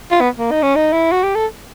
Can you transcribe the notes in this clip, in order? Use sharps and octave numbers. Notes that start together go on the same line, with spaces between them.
F4
B3
A#3
D#4
C#4
D#4
E4
F#4
G4
A4